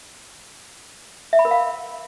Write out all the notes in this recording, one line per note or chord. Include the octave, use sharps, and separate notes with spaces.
E5
B5
A#4
F5